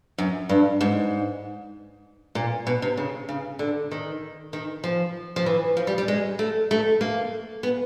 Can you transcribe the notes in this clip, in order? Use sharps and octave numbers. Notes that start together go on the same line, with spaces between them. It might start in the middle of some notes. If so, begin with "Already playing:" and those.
F#2
G2
G#2
A#2
B2
C3
C#3
C#3
D3
D#3
D#3
F3
F3
E3
F3
G3
G3
G#3
A3
A3
A#3
B3